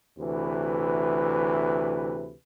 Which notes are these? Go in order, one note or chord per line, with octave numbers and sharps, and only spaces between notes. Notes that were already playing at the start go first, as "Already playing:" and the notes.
D2 C3 E3 B4